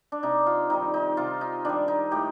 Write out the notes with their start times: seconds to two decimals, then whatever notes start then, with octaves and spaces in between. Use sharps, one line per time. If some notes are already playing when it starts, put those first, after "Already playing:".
0.12 D4
0.23 C3 D#4
0.46 F4
0.70 D#3 G3 D#4
0.94 D#4
1.17 C3 F4
1.41 D#4
1.65 D#3 G3 D4
1.88 D#4
2.11 A2 G4